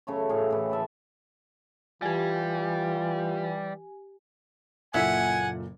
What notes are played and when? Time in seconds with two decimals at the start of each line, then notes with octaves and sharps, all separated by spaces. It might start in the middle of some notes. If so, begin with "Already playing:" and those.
0.07 F#2 C#3 A3 C#5
0.29 A2 G#4 F5
0.50 A2 E3
0.70 A2 E5 A5 B5
2.02 E3 G3 F4 G4 G#5
4.94 F#1 A#2 E4 A4 E5 F#5 G#5